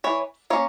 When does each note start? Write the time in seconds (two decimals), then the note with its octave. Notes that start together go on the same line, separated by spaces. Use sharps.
0.04 E3 C#5
0.50 A#3 C#4 C#5